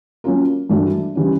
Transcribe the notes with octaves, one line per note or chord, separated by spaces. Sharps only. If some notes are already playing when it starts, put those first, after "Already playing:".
F#3 A#3 C#4 F4 A#4
G2 E3 A3 D4 F#4
C#3 E3 G3